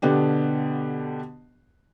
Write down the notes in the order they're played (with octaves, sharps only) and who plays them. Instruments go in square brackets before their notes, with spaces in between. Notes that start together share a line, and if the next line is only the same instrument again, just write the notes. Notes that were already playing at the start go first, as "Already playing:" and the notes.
[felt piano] B2 D3 B3 D4 G4